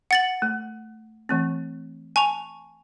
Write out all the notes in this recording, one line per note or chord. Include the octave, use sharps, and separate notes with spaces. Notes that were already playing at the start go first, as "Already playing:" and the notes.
F#5 A6 F#7
A3
E3 A3 C4
G#5 A5 C#6 F7